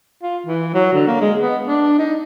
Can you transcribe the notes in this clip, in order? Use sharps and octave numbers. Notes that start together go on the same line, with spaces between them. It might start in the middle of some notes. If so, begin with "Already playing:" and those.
F4
E3
F#3
D3
A#3
G#3
B3
D4
D#4